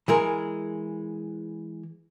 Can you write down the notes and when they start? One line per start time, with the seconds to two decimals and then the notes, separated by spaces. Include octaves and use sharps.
0.08 E3 G#3 A#4